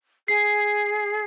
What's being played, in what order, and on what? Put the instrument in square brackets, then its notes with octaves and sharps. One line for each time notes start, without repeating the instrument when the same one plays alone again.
[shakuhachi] G#4 [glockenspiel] C7